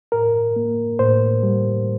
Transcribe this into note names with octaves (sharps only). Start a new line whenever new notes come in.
A2 A#4
A#3
A2 C5
G3